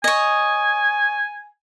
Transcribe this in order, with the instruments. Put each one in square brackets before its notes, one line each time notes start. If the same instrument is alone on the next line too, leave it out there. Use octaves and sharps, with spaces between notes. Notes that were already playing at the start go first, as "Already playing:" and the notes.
[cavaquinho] C#5 D#5 [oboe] G#5